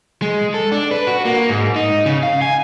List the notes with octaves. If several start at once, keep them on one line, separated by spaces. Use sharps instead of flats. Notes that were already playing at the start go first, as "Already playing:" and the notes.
G#3
A4
D4
B4
F#4
A#3
G#2
D#4
C#3
F5
G#5